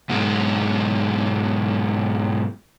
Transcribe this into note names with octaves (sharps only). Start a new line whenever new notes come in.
G#2 B2 F#3 G#3